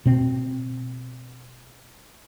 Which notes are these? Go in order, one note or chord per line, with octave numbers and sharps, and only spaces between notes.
B2 C4